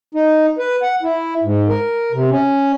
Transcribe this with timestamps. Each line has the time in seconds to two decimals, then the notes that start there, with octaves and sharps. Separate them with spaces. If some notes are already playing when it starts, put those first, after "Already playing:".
0.15 D#4
0.59 B4
0.82 F#5
1.03 E4
1.43 G#2
1.69 A#4
2.12 C3
2.30 C#4